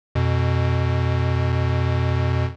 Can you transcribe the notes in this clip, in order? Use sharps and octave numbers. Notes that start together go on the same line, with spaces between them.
F2 B2